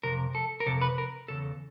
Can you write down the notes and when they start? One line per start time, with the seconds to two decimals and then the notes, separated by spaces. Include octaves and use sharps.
0.03 F2 C3 A#4
0.35 A4
0.60 A#4
0.66 F2 C3 A4
0.81 B4
0.98 A#4
1.28 E2 C#3 A4